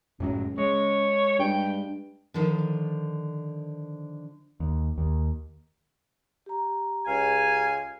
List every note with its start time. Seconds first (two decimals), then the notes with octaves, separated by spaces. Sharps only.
0.20 C#2 F#2 A2 F#3
0.58 G#3 C#5
1.39 G2 G5
2.34 D3 D#3 F3
4.60 D#2
4.98 D#2
6.46 G4 A#5
7.06 C#2 F5 G#5